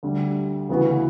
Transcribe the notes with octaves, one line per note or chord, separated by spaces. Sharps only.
D2 D3 G3
D2 C#3 E3 B3 F#4